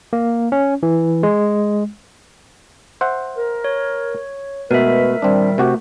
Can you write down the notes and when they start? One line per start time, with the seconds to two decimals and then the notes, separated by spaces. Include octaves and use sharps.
0.13 A#3
0.52 C#4
0.83 E3
1.23 G#3
3.01 C5 E5 F#5
3.37 A#4
3.64 C#5
4.71 B2 G#3 A3 A#4 B4 E5
5.22 A#2 D#3 G3 C4 D4
5.58 C3 A3 F#4 G4